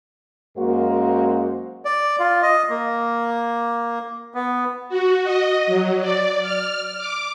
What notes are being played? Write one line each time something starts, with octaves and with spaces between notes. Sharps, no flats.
F#2 G#3 A#3 F#4 A#4 C5
D5
F4
D#5
A#3
B3
F#4
D#5
F#3
D5
F6
D6